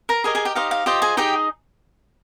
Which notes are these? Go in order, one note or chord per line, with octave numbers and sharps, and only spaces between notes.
A#4 A#5
G4 G#4 A#4 D#5 G#5
G#4 G#5
G4 G5
D#4 G4 C5 D#5 F5
F5
F4 G4 C5 D#5 G5
G#4 G#5
D#4 G4 G#4 D#5 G5